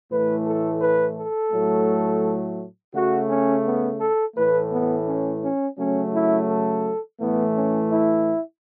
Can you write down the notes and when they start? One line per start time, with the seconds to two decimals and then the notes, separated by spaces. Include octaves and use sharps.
0.11 A2 E3 A3 B4
0.47 A4
0.81 B4
1.18 A4
1.52 A2 F#3 A3
2.94 C#3 A3 F#4
3.30 C#4
3.65 B3
4.01 A4
4.36 A2 E3 A3 B4
4.72 B3
5.07 C#4
5.43 C#4
5.78 C#3 F#3 A3 C#4
6.14 E4
6.49 A4
7.20 A2 E3 A3 B3
7.56 C#4
7.91 E4